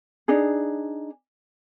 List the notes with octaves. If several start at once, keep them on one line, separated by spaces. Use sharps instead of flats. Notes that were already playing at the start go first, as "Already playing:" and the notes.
D4 D#4 G#4